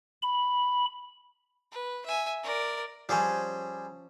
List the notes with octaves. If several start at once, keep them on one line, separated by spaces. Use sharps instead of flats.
B5
B4
E5 G#5
A#4 D5
F3 G3 C#4 G#4 C5